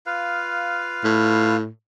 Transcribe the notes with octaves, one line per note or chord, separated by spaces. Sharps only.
F4 B4 F5
A2